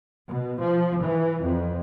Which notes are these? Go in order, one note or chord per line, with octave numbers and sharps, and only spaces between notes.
B2
F3
E3
F2